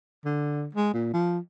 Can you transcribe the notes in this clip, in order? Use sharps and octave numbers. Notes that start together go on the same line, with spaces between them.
D3
G#3
A#2
F3